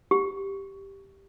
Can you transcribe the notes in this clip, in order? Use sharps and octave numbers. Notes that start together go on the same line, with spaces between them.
G4